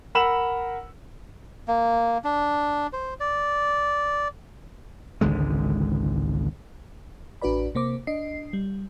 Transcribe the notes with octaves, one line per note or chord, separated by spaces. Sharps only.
A#4 F#5 B5 E6 E7 F#7
A#3
D4
C5
D5
G#1 C#2 D3 G#3
A1 D4 F#4 B4 D5 B5
C3 A#3 C5 D6
D4 D#5 C7
G3